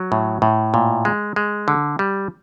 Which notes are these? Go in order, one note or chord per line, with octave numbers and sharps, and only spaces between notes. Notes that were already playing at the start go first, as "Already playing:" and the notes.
Already playing: F#3
A2
A2
A#2
G#3
G#3
D3
G3